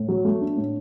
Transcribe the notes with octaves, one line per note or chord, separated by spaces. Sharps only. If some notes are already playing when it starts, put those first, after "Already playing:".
Already playing: A2
F#3
A3
D4
A2